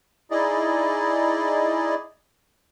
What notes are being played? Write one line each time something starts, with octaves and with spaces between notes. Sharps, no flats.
D#4 E4 G#4 D5 D#5